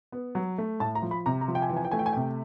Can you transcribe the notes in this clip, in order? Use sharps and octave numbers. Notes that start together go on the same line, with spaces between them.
B3
F#3
A3
A2 A5
A#5
F3
B5
C3 A#5
A#5
F3
G5
G#5
E3 G5
G#5
G5
A3 G#5
G5
G#5
C3 G5